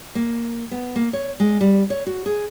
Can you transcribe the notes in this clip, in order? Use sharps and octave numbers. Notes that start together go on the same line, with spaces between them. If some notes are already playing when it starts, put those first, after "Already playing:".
A#3
B3
A#3
C#5
G#3
G3
C#5
F#4
G#4